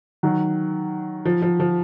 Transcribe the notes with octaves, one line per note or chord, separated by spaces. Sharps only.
D#3 F#3
F3
F3
F3